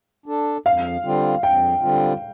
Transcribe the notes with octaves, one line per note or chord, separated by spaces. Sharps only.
D4 A4
F2 F5
D3 G3 C4 F4
F2 G5
D3 G3 C4 F4